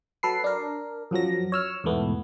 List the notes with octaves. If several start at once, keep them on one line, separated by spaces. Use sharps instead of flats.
F#3 A4 B4 C7
D4 A#4
F#2 F3 F#3 A#6
C#5 E6 F6
E2 G#2 B2 E3 A3 B3